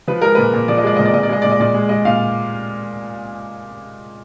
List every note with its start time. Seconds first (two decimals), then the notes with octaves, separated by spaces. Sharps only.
0.08 F3 B4
0.22 G#3 A#4
0.35 A#2 B4
0.53 A#2
0.68 F3 D5
0.78 D#5
0.84 G#3 D5
0.97 A#2 D#5
1.05 D5
1.13 A#2 D#5
1.23 D5
1.29 G#3 D#5
1.42 A#2 D5
1.51 D#5
1.60 A#2 D5
1.75 G#3
1.89 G#3 D#5
2.05 A#2 F5